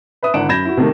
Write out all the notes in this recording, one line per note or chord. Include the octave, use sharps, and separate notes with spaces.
B4 E5 D#6
G#1 D3 E4 F#5 D7 E7
F#2 B5 G6 G#6 A#6 E7
E4 F#4
C3 D#3 A3 A#3